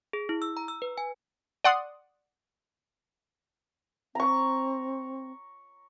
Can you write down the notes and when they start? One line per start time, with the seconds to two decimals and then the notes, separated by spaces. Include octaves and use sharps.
0.13 G#4
0.29 E4
0.42 E6
0.57 A#5
0.68 E6
0.82 B4
0.98 G#5
1.64 D5 F#5 C6 D#6
4.15 C4 A#5 C#6